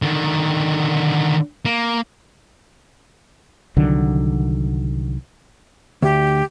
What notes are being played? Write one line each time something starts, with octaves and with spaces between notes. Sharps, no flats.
D3 D#3
A#3
C2 D3 D#3 F#3
D2 G4